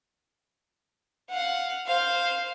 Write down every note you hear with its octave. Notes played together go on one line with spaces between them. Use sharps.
F5 F#5
C5 F5